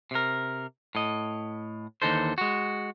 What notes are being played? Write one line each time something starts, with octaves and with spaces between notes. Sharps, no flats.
C3 A#4
A2 D#5
D#2 D3 E3 D#4 A4 C5
G#3 F#4